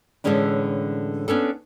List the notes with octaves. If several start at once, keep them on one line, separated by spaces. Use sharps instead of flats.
A2 D3 E3 G#3 C#4 D4
B3 C#4 D4 A4